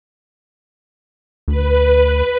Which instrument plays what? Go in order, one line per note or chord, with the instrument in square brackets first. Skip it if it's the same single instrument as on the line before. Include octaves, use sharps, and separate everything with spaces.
[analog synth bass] D2 [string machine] B4